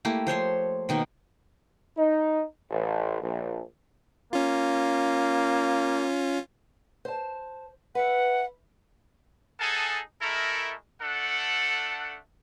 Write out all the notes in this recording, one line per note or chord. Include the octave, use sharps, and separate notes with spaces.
A3 A#3 E4 G4
F3 C5 C#5 C6
B2 D#3 A#3
D#4
A1
A#1
A#3 C#4 F4
C5 A5
B4 E5 F#5
D#4 G#4 A4 F#5 G#5 A5
G#3 A3 E4 A4 A#4
A3 D4 A4 F#5